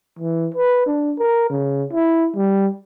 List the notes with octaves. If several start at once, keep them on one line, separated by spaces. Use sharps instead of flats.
E3
B4
D4
A#4
C#3
E4
G3